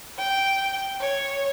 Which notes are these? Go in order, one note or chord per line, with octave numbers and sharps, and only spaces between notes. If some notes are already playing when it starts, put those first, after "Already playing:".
G5
C#5